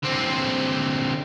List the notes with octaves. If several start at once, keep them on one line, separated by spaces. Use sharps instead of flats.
D3 C4